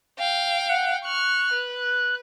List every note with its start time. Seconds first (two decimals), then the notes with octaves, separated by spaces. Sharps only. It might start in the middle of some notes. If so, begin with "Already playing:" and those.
0.19 F5 G5
0.68 F#5
1.04 C#6 F6 F#6
1.53 B4